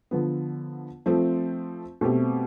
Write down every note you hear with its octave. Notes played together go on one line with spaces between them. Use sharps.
D3 F3 B3
F3 A3 C4
B2 A3 C4 G4